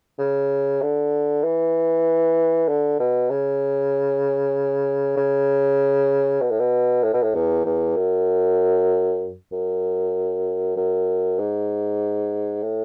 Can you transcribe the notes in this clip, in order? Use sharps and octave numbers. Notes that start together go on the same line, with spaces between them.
C#3
D3
E3
D3
B2
C#3
C#3
B2
A2
B2
A2
B2
A2
E2
E2
F#2
F#2
F#2
G#2
A2